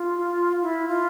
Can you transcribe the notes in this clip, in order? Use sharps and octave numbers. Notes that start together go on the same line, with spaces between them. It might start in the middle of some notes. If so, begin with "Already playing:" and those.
Already playing: F4
E4
F4